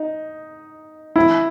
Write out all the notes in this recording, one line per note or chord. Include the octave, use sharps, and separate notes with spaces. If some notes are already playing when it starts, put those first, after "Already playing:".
Already playing: D#4
E4